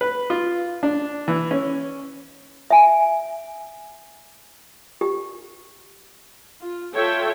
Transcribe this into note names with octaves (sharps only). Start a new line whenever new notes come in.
B4
F4
D4
E3
C#4
E5 G#5
G4
F4
F4 A4 C#5 E5 G5